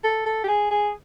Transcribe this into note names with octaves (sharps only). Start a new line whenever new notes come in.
A4
A4
G4
G#4
G#4